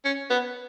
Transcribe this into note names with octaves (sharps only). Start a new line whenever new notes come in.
C#4
B3